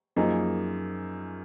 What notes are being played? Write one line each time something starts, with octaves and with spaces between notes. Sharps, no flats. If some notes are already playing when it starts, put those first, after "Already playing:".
F#2 F3 A#3 D#4 G#4